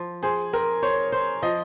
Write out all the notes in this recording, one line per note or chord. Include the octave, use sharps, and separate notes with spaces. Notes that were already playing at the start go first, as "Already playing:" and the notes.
Already playing: F3
G#4 C5
C4 A#4
C5 C#5
C5
F3 D#5